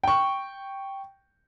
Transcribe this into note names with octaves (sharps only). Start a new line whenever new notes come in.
G5 C#6